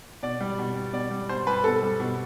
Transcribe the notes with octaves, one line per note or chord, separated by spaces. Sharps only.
B2 D5
G3
B2
G3
B2 D5
G3
B2 C5
G3 B4
B2 A4
G3
B2